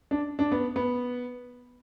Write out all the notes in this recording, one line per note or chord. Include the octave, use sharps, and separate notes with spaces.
D4
D4
B3
B3